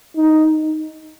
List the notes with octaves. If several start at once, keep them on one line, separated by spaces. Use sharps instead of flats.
D#4